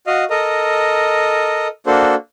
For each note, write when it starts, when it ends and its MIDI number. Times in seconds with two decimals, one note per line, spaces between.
0.07 0.24 66
0.07 0.24 75
0.07 0.24 77
0.30 1.68 69
0.30 1.68 70
0.30 1.68 75
1.87 2.15 58
1.87 2.15 62
1.87 2.15 66
1.87 2.15 69
1.87 2.15 72